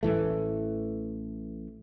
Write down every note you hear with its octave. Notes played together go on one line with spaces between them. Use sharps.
A1 A2 E3 A3